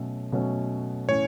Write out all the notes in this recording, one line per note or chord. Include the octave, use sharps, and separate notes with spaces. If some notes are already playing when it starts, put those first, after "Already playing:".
Already playing: B2 F#3 A3 C#4 A4
B2 F#3 A3 C#4 A4
A2 E3 C#4 C#5